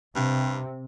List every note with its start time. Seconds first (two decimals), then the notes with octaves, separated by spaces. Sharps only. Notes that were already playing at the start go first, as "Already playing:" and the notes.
0.16 G2 C3